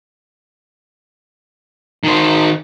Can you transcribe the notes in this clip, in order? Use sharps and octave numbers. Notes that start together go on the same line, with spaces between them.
D#3 C5